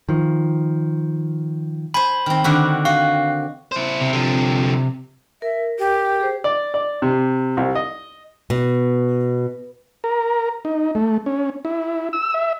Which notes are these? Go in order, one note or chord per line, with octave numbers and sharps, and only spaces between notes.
D#3 F3
C5 G#5 B5
D#3 C4
D3 D#3 F#4
F#4 F5
E4 C5
C3
D3 F3
A#4 E5
G4
G#4 C5
D5
D5
C3
C2
D#5
B2
A#4
D#4
A3
C#4
E4
E6
E5